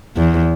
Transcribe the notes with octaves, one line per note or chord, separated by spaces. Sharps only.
E2